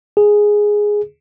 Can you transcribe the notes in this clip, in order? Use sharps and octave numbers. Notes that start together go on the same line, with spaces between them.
G#4